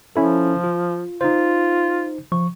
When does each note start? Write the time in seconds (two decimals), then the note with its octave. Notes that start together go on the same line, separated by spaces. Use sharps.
0.16 F3 C#4 E4 A4
0.64 F4
1.21 D#4 F4 C5
2.32 F3 C#6